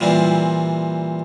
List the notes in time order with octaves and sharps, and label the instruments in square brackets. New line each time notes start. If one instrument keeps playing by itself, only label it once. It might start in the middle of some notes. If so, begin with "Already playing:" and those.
[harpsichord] A#2 E3 G3 C4